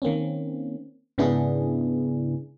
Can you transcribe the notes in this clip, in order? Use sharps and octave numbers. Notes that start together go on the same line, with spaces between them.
D#3 A#3 C4 C#4
G#2 C#3 B3 D4 E4 G#4